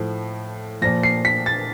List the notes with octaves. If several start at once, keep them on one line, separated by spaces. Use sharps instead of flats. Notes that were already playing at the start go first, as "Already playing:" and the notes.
Already playing: A2 F3
A#2 F3 A#6
C7
B6
A6